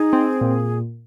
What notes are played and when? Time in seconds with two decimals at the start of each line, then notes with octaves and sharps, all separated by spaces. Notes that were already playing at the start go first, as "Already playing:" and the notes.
Already playing: D#4 G#4
0.13 C4
0.41 A#2